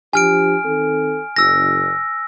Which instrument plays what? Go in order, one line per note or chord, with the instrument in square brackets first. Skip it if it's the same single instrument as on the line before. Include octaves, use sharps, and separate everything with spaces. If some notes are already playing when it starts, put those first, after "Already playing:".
[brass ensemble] F3 D4 G4 [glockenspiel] G#5 F6 D7
[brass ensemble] D#3 C4 A4
[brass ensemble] F#1 [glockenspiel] E6 A#6